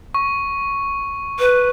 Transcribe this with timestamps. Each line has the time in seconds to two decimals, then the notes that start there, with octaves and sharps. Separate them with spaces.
0.14 C#6
1.39 B4